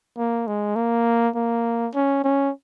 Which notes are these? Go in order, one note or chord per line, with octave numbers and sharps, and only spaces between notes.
A#3
G#3
A#3
A#3
C#4
C#4